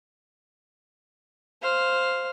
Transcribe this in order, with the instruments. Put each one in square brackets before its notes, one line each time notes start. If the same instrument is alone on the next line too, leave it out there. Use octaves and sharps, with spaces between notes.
[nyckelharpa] C5 F5